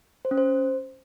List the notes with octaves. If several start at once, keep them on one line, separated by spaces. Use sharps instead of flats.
C5
C#4
C5